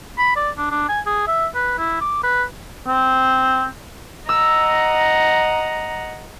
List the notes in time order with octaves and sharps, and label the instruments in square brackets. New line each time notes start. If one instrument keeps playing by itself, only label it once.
[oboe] B5
D5
D4
D4
G#5
G#4
E5
B4
E4
D6
B4
[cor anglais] C4
[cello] D#5 F#5 [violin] A#5 [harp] E6